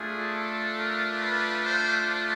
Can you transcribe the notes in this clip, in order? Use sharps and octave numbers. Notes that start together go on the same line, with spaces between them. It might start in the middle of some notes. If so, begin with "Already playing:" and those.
Already playing: A3 D4 F4 G#4
A4
A#4
B4
C5